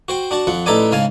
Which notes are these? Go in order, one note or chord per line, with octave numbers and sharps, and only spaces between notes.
F#4 C5 G5
D4 F#4 A5
F2 F3 F#5
A1 D#4 A4 B4 D5 G#5
G#2 C#3 F5 G#5 A5